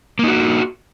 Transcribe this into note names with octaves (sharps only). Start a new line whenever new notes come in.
A#3 D#4 F#4